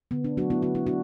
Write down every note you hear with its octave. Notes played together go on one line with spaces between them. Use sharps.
D3 B3
D4
F#3 A3 D4 F#4
B3 E4
D3 F#4
E4
D4 F#4